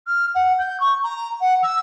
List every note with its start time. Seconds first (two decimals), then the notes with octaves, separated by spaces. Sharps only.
0.07 F6
0.35 F#5
0.59 G6
0.80 C#6
1.03 A#5
1.41 F#5
1.63 E6